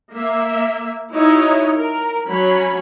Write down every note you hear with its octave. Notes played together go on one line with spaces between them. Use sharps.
A#3 E5
D#4 E4 F#4 C#5 D#5
A#4
F#3 C#4 C#5 B5